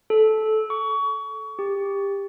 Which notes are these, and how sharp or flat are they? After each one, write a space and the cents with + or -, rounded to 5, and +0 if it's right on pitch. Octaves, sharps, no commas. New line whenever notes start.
A4 -15
C#6 +25
G4 +20